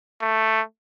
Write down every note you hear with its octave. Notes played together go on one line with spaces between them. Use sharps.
A3